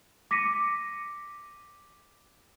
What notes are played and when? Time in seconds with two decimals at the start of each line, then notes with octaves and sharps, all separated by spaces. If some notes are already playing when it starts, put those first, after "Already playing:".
0.31 D6 A#6 B6 C#7 D#7